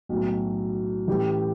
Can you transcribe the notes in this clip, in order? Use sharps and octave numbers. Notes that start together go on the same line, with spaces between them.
B1 A2 F#3
A2 E3 A3 C#4 G4